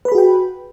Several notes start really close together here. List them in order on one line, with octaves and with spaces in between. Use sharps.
B4 B5 G#4 F#4 G5